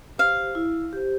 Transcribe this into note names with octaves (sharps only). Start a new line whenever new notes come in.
G4 C5 F5
E4
G4 C5